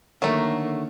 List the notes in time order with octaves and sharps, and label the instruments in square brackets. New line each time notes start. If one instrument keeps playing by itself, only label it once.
[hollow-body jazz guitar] D3 D#3 A#4 [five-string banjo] F#3 A3 [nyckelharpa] A#3